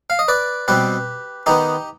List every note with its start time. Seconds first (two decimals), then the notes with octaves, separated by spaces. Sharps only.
0.10 F5
0.19 D#5
0.28 B4 D5
0.68 B2 G3 C4 G4 B4
1.46 D#3 B3 D#4 G4